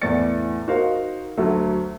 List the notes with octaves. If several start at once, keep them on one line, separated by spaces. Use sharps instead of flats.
E2 A2 D5 A6 C#7
D#4 F#4 A#4 C5 F5
D2 F#3 A4 E5